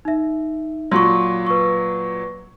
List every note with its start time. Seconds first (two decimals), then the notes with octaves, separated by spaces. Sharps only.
0.05 D#4 E5
0.92 A#2 F#3 C6 C#6
1.46 B4 C#6